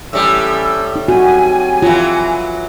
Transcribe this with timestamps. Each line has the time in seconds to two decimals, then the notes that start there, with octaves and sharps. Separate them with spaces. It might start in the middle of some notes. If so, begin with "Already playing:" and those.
0.13 A2 E3 G3 C#4 E6
0.96 D#4
1.08 C4 F#4 G4 G#5
1.82 E3 F#3 F4